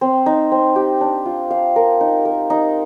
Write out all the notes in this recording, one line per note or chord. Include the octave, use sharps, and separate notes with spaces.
C4
D#4
C4
G4
D4
F4
F5
A#4
D#4
A#4
D#4